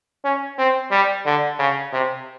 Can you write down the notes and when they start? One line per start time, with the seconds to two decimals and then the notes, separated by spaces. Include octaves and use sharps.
0.25 C#4
0.58 C4
0.91 G3
1.26 D3
1.59 C#3
1.93 C3